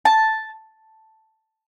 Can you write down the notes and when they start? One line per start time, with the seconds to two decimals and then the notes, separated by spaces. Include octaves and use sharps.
0.05 A5